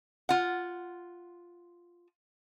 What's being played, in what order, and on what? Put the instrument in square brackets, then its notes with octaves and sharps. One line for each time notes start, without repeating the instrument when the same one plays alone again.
[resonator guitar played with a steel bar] F4 F#5